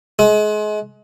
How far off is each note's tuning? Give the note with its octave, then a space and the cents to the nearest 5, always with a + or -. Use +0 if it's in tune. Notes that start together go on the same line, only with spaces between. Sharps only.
G#3 +30